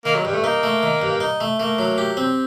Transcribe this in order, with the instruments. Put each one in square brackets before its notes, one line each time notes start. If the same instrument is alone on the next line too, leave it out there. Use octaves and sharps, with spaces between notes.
[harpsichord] D#3 [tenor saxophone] A#3
[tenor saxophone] F#3
[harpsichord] G2 [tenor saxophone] G3
[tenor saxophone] A3
[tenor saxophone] A#3 [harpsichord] D#4
[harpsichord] A3
D#3
G2
D#4
A3
[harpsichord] A3 [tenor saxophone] A#3
[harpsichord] F#3
G4
C4